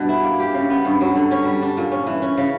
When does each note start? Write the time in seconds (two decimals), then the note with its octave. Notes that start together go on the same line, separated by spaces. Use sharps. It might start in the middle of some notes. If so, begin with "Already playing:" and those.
Already playing: G2 B2 D4
0.09 E4
0.24 A#3
0.39 G4
0.54 C#3
0.70 B3
0.85 G2
1.01 F#3
1.15 D3
1.31 C#4
1.45 G3
1.61 D4
1.77 A#2
1.92 C#4
2.07 E3
2.22 C#4
2.37 C#3